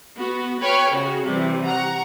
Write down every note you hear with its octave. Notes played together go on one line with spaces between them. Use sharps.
B3 F#4
B4 C#5 G5 B5 F6 F#6
C#3 F#4
C3 E3 G3
F#5 A#5 C#6